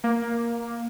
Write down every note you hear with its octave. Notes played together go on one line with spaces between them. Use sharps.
A#3